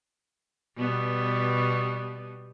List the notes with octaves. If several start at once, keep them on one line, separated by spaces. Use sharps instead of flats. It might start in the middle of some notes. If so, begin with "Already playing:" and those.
B2 G3 B3